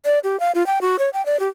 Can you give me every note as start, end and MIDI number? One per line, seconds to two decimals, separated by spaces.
0.05 0.19 74
0.24 0.39 67
0.40 0.52 77
0.55 0.65 65
0.66 0.79 79
0.81 0.96 66
0.99 1.10 73
1.13 1.24 79
1.26 1.39 74
1.40 1.48 67